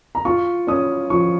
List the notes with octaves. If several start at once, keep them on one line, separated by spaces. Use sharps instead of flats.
A#5
F4 C#6
C#4 D#6
F3 C#6